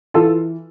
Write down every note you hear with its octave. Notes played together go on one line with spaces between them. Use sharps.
E3 F4 A4